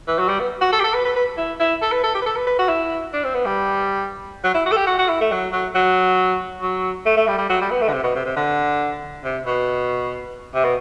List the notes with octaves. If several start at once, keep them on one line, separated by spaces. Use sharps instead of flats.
E3
F#3
G3
B3
F#4
A4
G4
A4
B4
B4
B4
E4
E4
A4
B4
A4
G4
B4
A4
B4
B4
F#4
E4
D4
C4
B3
G3
F#3
E4
F#4
A4
G4
F#4
F#4
E4
A3
F#3
F#3
F#3
F#3
A3
A3
G3
G3
F#3
G3
B3
A3
D3
C3
B2
C3
C3
D3
C3
B2
C3
B2